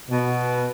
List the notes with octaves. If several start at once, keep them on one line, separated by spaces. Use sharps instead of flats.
B2